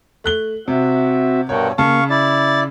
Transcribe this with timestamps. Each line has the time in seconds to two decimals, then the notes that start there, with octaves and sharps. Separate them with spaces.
0.24 A3 F#6 G7
0.68 C3 C4 F#4 E5
1.49 G2 B2 A#4 C#5 F#5 G5
1.78 C#3 A#3 F5 A5 C#6
2.10 E4 D5 A6